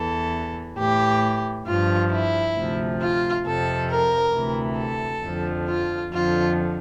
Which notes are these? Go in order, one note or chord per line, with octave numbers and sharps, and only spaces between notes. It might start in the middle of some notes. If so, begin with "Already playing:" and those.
Already playing: E2 E3 A4
A2 E3 G4
G2 F3 F4
E4
D2 C3 F3
F4
F2 C3 F3 A4
A#4
D2 C3 E3
A4
F2 D3 F3
F4
F2 D3 F3 F4